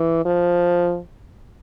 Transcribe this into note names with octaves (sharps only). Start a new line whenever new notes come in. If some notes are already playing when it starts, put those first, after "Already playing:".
Already playing: E3
F3